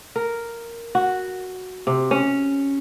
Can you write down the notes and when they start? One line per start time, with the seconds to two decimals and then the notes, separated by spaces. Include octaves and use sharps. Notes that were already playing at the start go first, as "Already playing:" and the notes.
0.16 A#4
0.95 F#4
1.87 C3
2.11 C#4